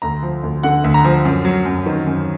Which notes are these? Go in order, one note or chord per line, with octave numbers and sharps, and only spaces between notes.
D2 A#5
F3
D2
D3 F#5
D2
A#5
F3
F#2
F#3
F#2
D#3
F#2